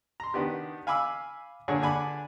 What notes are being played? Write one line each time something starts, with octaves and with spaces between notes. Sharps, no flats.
A#5 C6
D#3 B3 D4 G4
F5 G#5 B5 D6 E6
G2 A#2 D3 D4 G#4 C#5
D3 D4 G#5 B5 D6